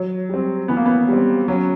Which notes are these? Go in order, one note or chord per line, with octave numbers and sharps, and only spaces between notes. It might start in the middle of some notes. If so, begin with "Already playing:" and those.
Already playing: F#3
G3 C4
E3 B3
A#3
B3
G3 C4
F#3 C#4